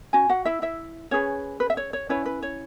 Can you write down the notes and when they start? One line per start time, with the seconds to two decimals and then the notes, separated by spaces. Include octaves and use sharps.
0.13 C#4 F#4 G#5
0.29 F#4 F#5
0.45 E4 E5
0.62 E4 E5
1.11 C#4 G#4 B4 C#5
1.60 B4
1.70 E5
1.77 C#5
1.93 C#5
2.09 C#4 E4 B4 C#5
2.26 B4
2.43 C#5